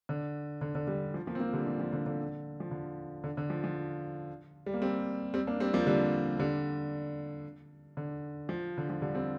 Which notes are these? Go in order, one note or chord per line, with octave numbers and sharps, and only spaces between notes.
D3
D3
D3
D3 G3
F3
F3 A#3
C4
F3 A#3
D3 G3
F3
F3
D3
D3
F3
D3
D3
D3
F3
F3
G3
A#3
G3 C4
G3 C4
A#3 D4
G3 C4
F3 A#3
D3 G3
D3 G3
D3
F3
D3
F3
D3 G3
G3 C4